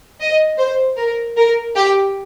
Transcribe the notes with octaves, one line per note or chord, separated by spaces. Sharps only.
D#5
C5
A#4
A#4
G4